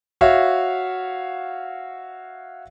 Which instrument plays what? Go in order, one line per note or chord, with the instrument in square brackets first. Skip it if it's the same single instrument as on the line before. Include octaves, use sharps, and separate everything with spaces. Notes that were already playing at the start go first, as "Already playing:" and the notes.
[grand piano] F#4 C#5 E5 F5